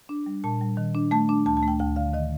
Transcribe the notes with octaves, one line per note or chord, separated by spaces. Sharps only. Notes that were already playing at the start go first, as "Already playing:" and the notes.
D4
G3
A#2 A5
G3
D#3
D4
A3 A5
D4
D2 A5
A5
A3 G5
D2 G5
D3 F5
D#3 D#5